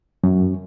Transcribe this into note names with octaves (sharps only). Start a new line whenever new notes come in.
F#2